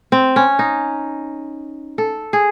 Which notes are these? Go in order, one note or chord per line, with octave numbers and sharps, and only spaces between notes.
C4
C#4
D#4
A4
G#4